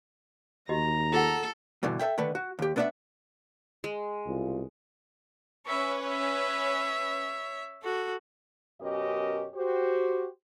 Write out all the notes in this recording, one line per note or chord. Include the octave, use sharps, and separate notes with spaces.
D#2 F#4 G4 D#5 A#5
F4 G#4 A4 F#5
G2 B2 D3 E3
A4 B4 E5 G5
D3 D#3 A3 B4
F#4
D#2 G4
A3 B3 D4 D#5 E5 F#5
G#3
C2 B2 F4
C#4 B4 E5 C#6
C#5 E5
F#4 A4
F#2 B2 C#4 G4 A#4 D#5
F#4 G4 C5